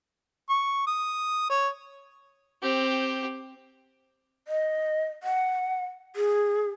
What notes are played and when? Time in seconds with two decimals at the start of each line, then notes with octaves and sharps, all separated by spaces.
0.50 C#6
0.87 D#6
1.50 C#5
2.62 C4 G4
4.48 D#5
5.23 F#5
6.16 G#4